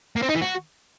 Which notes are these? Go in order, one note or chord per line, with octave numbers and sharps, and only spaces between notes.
A#3
C4
D#4
E3
F#4